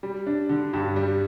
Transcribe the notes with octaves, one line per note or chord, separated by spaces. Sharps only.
G3
D4
D3
G2 G4
G3